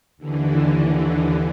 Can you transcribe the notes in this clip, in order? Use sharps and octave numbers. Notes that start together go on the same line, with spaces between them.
D#2 D3 E3